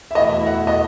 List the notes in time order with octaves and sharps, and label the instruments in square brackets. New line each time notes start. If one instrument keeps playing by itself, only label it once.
[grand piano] E5
[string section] E2 B2 A3 E4 [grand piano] D#5
[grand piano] E5
F#5
E5
D#5